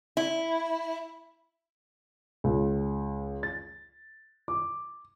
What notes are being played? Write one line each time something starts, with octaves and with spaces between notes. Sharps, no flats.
E4
C#2
A6
D6